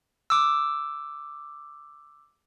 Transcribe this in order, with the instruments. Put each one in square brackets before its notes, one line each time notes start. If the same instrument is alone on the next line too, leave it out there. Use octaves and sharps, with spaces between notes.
[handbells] D6 E6